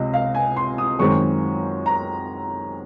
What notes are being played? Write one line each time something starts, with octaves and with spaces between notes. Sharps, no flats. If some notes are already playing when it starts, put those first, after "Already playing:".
Already playing: C#2 C3 D#5
F5
G#5
C6
D#6
F#2 D#3 G#3 C4 C#6
A#5